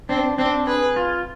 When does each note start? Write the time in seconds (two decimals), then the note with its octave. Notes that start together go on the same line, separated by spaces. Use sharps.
0.09 C4 D4
0.38 C4 D4
0.67 G#4 B4
0.96 F4